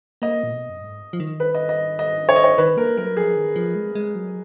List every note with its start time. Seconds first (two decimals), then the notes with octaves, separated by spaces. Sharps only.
0.22 A#3 D#5
0.43 A#2
0.52 B2
0.69 F#2
0.82 G#2
1.13 F3
1.20 D#3
1.40 B4
1.55 D#5
1.69 D#5
1.99 D#5
2.29 C#5
2.36 D#5
2.44 C#5
2.58 D#3 B4
2.77 A#3 A#4
2.97 F#3 A#4
3.17 F3 G#4
3.36 D#3
3.56 F3
3.75 G#3
3.95 G#3
4.15 F#3